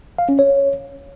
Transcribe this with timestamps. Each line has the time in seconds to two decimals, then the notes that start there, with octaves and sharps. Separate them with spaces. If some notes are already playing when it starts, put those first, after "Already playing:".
0.18 F5
0.29 C#4
0.39 C#5